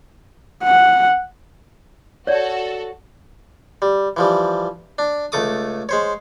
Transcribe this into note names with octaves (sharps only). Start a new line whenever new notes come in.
F#5
F#4 A4 C#5 D5
G3
E3 F3 G3
D4
C#2 A3 A4 D6 D#6
G#3 C5 C#5